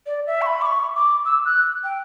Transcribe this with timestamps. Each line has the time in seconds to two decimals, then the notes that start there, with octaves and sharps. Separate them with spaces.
0.06 D5
0.27 E5
0.42 C#6
0.46 B5
0.61 D6
0.66 C#6
0.96 D6
1.25 E6
1.45 F#6
1.84 G5